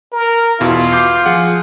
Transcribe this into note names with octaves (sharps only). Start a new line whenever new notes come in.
A#4
E2 B2 E4 F4
D6 G6 C7
F3 G#4 F#5